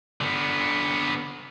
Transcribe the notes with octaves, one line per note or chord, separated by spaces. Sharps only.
D3 B3